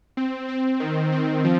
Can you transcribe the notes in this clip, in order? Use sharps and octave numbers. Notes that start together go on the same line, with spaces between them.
C4
C4
D#3
C4
F3